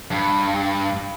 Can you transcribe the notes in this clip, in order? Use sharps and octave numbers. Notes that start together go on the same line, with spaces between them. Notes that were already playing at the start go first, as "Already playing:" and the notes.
G2